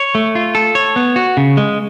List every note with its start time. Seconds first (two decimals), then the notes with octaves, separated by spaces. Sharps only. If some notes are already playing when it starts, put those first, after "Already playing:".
Already playing: C#5
0.15 A3
0.35 F4
0.55 A4
0.75 C#5
0.96 B3
1.16 F#4
1.37 C#3
1.57 G#3